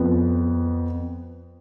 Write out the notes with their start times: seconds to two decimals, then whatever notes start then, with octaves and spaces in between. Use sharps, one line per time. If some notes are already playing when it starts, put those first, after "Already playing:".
Already playing: F2 F3 B3